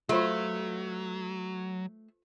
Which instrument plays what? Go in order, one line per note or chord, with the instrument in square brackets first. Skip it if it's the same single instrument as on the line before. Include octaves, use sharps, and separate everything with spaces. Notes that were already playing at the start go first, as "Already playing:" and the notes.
[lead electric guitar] F#3 [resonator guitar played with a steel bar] A3 [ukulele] F4 B4 C5